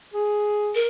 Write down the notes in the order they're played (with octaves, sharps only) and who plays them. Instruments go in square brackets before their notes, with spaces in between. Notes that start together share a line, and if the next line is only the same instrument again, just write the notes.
[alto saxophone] G#4
[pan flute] A#4